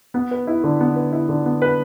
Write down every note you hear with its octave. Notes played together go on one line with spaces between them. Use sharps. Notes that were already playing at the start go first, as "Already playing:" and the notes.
B3
B4
E4
D3
B3
B4
E4
D3
B3
B4